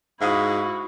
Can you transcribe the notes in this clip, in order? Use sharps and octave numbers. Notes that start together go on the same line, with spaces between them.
G#2 E4 F#4 F5 D#6